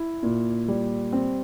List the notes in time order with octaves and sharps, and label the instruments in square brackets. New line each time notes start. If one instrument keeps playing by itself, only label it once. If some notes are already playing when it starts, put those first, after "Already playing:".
Already playing: [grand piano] E4
A#2
G3
C4